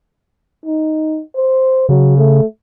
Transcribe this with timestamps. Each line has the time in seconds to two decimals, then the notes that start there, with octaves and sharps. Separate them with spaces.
0.65 D#4
1.36 C5
1.89 C#3 F#3
2.18 A3